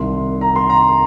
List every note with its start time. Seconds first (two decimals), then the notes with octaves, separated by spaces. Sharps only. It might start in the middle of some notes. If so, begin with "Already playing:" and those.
Already playing: C2 C3 D#3 C6
0.41 A#5
0.56 C6
0.70 A#5